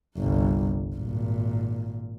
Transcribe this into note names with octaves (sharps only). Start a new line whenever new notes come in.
G1 C2
G#1 A#2